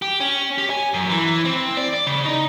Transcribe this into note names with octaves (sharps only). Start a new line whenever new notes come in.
G4
C#4
G4
G#5
F#2
E3
C4
D5
D5
C#3
D#4